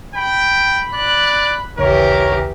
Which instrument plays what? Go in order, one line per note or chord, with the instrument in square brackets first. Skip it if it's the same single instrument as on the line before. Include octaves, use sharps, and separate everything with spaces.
[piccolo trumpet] G5 [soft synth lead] B5
[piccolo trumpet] D5 [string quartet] F#6
[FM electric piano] A#1 D#2 C#3 [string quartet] E3 G4 [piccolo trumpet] A#4 [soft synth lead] C#5